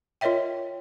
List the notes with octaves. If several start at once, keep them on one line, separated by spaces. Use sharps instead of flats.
F4 A#4 C#5 D#5 E5 G5